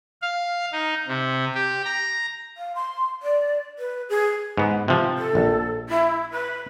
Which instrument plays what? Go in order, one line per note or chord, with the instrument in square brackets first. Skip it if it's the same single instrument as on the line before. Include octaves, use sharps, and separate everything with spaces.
[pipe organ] F5
D#4
C3
G4
A#5
[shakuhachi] F5
C6
D5
B4
G#4
[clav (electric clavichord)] G#2 B3
C3 F3
[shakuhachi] A4
[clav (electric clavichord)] A#1
[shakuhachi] E4
B4